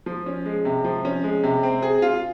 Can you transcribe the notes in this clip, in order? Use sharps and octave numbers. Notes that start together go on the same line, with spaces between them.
F3
C#4
G#3
C3
F3
C#4
G#3
C3
C4
G#4
F4